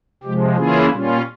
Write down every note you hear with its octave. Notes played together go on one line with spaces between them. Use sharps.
C3 F3 G#3 G4
C#3 E3 A#3 C#4 E4 F4 G#4
A#2 G3 C#4 F4